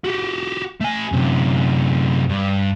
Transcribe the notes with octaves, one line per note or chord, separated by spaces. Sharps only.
F#4 G4
A3 G#5
F#2 C3
G2